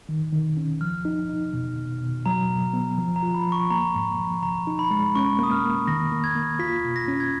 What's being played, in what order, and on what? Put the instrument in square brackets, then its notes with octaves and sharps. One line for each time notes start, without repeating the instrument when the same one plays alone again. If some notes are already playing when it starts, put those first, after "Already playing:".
[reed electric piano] D#3
D#3
C#4
[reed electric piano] F3 [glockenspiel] F6
[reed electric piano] D#4
D#4
B2
B2
B2
[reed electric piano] F#3 [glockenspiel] A#5
[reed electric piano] B2
B3
F3
[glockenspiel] A#5
[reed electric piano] F4
[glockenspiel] B5
[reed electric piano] F3
[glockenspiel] C#6
[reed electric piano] A#3 [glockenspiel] A#5
[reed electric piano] G#2
F3
[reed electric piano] C#3 [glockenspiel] A#5
[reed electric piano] D#4
[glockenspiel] B5
[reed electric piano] G#3
[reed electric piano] C#4 [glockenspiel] C#6
[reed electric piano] A#3 [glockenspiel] D#6
[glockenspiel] F6
[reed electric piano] A#3
[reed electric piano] D#3 [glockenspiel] A#6
[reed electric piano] A#3
[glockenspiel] G#6
[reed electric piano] A#3
[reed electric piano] F4 [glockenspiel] B6
[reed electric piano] B2
[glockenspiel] A#6
[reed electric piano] C#4
[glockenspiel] G#6